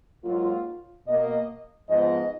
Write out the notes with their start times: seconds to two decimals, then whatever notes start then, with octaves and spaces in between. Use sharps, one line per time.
0.24 G#2 F#3 A#3 F4
1.06 B2 A#3 D#5
1.89 G#2 F3 B3 D#5